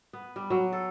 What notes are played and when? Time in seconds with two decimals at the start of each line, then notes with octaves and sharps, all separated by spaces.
0.13 B3
0.36 G3
0.50 F#3
0.72 A4